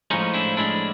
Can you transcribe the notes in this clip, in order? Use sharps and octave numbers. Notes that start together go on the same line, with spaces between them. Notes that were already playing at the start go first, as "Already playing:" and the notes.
A2 F3 G#3 C#4 D#4
D4 E4
A2 F3 G#3 D4 E4